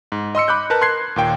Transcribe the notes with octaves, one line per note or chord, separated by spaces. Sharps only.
G#2
D#5 C6 E6 C#7
B5 D6 F#6 G6
A#4 B4 A5 F#6
C6 F#6 G#6 C7
D#2 A#2 G5